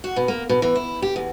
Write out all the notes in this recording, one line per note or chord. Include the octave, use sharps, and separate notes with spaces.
F#4
B2
A#3
B2
E3
E4
G4
E2